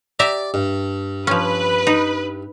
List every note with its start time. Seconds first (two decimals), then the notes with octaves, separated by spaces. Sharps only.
0.19 G4 D5 E5 A#5
0.54 G2
1.27 F3 C#4 B4
1.87 D#4